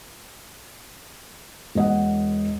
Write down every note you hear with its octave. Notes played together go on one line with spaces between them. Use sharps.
E1 D#5 F#5